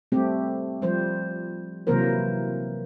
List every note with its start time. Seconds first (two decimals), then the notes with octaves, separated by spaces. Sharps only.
0.12 G3 A3 C4 G4
0.82 F3 G3 C5
1.87 C3 E3 F#3 A#3 A#4 C5